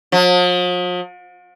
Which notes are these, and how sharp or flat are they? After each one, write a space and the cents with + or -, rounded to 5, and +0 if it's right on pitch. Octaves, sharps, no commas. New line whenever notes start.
F3 +45